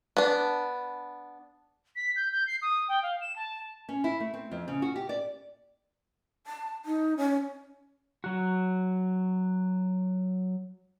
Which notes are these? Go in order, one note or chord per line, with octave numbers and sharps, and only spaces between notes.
B3 D4
B6
G6
G6
C7
D#6
G5
F5
E7
A5
C#4
E4
A3
C4
F2
C#3
F#4
G4
D5
A5
D#4
C#4
F#3 F#4